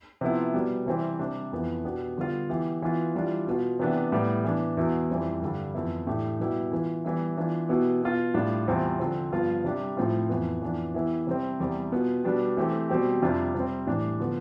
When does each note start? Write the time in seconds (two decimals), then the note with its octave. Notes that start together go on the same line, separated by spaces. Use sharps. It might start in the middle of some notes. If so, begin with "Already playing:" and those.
0.21 C3 F3 B3 E4
0.54 B2 G3 B3
0.86 C3 E3 G3 C4
1.19 C3 G3 D4
1.52 F2 E3 B3
1.84 B2 B3 D4 G4
2.17 D3 G3 B3 F4
2.49 E3 B3 E4 G4
2.82 E3 B3 F4
3.14 E3 G3 D4 F4
3.47 B2 B3 F4
3.79 C3 E3 B3 D4 G4
4.12 A2 G3 B3
4.44 E3 B3 D4
4.77 E2 B2 B3 E4
5.09 F2 E3 G3 C4 E4
5.42 G2 D3 G3
5.74 F2 E3 B3 E4
6.07 A2 E3 A3 D4 G4
6.39 B2 G3 B3 E4 G4
6.72 E3 B3 F4
7.05 E3 G3 B3 E4
7.37 E3 B3 D4 F4
7.69 B2 B3 E4 G4
8.02 B2 B3 F4
8.34 A2 G3 D4 F4
8.67 E2 C3 G3 C4 F4
8.99 D3 F3 C4
9.32 G2 F3 B3 F4
9.64 C3 G3 D4 G4
9.97 A2 F3 C4 F4
10.29 F2 E3 B3
10.62 F2 E3 B3 D4
10.94 E3 B3 E4 G4
11.27 C3 G3 C4
11.60 E2 C3 G3
11.92 B2 B3 F4
12.24 B2 G3 B3 D4 G4
12.57 E3 A3 C4 G4
12.89 B2 G3 C4 G4
13.22 F2 C3 G3 D4 F4
13.54 C3 G3 C4
13.87 A2 E3 G3 D4
14.20 D3 F3 B3